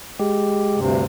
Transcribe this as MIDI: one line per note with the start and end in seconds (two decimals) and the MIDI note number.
0.19 0.80 56
0.19 0.80 67
0.76 1.03 38
0.76 1.03 43
0.76 1.03 48